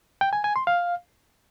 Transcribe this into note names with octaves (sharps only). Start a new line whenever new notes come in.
G5
G#5
G#5
C6
F5